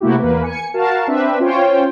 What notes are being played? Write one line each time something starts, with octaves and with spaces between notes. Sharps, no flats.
C3 A3 A#3 E4 F#4 G4
E2 A#3 B4
G#5 C#7
F#4 A#4 F5 A5
C4 D4 B4 E5
C#4 F4 C5 C#5 G5